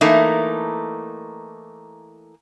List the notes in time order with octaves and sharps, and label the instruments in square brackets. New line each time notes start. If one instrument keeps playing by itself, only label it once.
[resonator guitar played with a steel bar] E3 A3 A#3 D#4